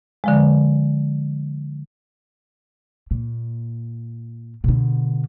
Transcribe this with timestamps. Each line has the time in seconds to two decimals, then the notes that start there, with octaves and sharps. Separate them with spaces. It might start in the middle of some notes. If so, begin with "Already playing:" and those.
0.24 D3 F3 G#3
3.11 A#2
4.64 B2 D3